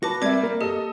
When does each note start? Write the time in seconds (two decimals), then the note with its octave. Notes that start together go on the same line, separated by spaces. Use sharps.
0.03 F#4 B4 A5 D6 A#6
0.22 G3 C4 A#4 E5 D6 G#6
0.43 A#3 A#4
0.61 G4 A4 D#5